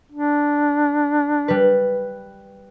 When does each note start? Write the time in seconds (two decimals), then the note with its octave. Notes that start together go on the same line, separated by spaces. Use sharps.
0.12 D4
1.48 G3 B4